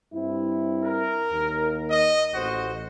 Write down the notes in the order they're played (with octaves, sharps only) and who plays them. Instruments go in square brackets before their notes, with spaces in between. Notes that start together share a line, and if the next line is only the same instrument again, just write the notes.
[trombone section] G2 C4 E4
[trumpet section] A#4
[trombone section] D#2
[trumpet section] D#5
[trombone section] A1 [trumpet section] F#4 C5